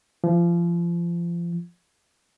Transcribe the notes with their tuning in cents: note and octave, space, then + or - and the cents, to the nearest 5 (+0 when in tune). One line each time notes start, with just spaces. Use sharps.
F3 -30